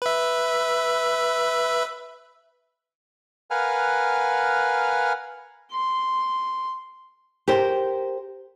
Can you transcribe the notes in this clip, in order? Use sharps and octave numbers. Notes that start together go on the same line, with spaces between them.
B4 E5
A#4 B4 F5 F#5 G#5 F6
C6
G4 A#4 C5